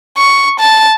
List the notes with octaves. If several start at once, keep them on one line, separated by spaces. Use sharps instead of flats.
C#6
A5